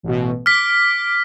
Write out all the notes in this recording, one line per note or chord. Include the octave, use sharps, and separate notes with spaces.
A1 B2
D6 F6 B6